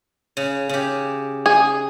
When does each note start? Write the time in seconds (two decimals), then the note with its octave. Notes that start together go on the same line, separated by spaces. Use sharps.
0.37 C#3
0.69 C#3 G4
1.46 G#4